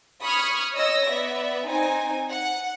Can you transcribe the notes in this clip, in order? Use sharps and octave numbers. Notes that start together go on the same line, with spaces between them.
B5 C#6 D#6 F6 G#6
C#5 D#5 E6 A#6
B3 D5 E5
C4 D#4 G#5
F#5